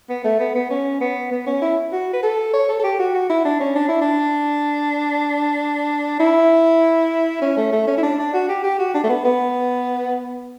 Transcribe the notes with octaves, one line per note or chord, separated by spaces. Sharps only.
B3
A3
B3
B3
C#4
B3
B3
C#4
E4
F#4
B4
A4
C#5
A4
A4
G4
F#4
F#4
E4
D4
C#4
D4
E4
D4
E4
C#4
A3
A3
C#4
E4
D4
D4
F#4
G4
G4
F#4
D4
A3
B3
B3